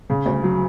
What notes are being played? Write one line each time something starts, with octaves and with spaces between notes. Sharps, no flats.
C#3
D2
F#3